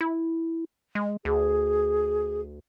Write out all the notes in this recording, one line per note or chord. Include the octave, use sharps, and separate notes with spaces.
E4
G#3
D2 G#4